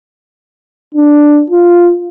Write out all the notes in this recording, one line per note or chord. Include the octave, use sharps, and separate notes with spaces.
D4
F4